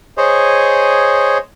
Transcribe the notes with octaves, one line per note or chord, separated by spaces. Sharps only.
G#4 C5 C#5 D#5